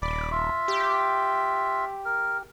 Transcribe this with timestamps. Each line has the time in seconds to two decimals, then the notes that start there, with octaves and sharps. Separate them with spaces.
0.02 D#1 D5 B5 D6
0.31 F4 E5
0.68 G4
2.05 A#4